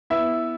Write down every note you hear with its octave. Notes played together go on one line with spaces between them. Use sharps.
B3 E4 E5